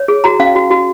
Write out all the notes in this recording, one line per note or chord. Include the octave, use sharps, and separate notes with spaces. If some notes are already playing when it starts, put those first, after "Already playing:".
Already playing: C#5
G#4
F#4 A#5
C#4 F5
F#4
F#4